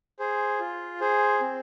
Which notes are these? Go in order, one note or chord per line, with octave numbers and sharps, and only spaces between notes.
G#4 C5
F4
G#4 C5
C4